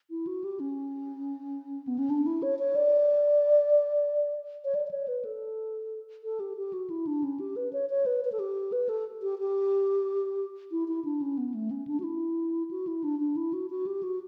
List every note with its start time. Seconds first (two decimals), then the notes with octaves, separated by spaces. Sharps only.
0.10 E4
0.27 F#4
0.44 G4
0.60 C#4
1.87 B3
1.98 C#4
2.10 D4
2.26 E4
2.42 C#5
2.59 C#5
2.75 D5
4.64 C#5
4.75 D5
4.87 D5
4.91 C#5
5.08 B4
5.25 A4
6.24 A4
6.40 G4
6.57 G4
6.73 F#4
6.90 E4
7.07 D4
7.23 C#4
7.40 G4
7.56 B4
7.73 C#5
7.90 C#5
8.06 B4
8.25 B4
8.32 A4
8.39 G4
8.72 B4
8.89 A4
9.22 G4
9.39 G4
10.71 E4
10.88 E4
11.05 D4
11.21 C#4
11.38 B3
11.54 A3
11.71 C#4
11.87 D4
12.00 F#4
12.03 E4
12.71 F#4
12.87 E4
13.04 D4
13.20 D4
13.36 E4
13.53 F#4
13.70 F#4
13.86 G4
14.03 F#4